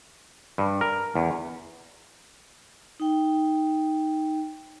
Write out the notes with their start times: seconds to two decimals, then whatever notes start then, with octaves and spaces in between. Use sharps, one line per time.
0.58 G2
0.81 A#4
1.15 E2
3.00 D#4 G5